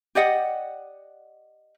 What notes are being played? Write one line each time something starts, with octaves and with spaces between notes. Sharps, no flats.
G4 D5 D#5 F#5